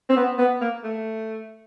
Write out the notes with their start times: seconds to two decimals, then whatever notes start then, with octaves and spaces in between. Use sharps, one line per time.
0.09 C4
0.16 B3
0.38 B3
0.61 A#3
0.84 A3